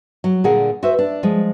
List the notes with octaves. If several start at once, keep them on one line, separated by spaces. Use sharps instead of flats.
F#3
A#2 D3 G#4 A#4 F#5
F#4 B4 C5 E5
D4
F3 G#3